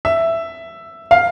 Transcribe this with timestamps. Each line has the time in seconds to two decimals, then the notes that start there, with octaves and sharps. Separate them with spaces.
0.05 E5
1.11 F5